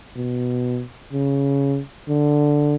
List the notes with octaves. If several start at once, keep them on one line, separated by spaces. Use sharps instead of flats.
B2
C#3
D3